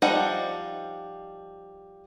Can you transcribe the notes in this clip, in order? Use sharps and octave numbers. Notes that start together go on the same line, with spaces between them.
F3 G3 D#4 F#5 A#5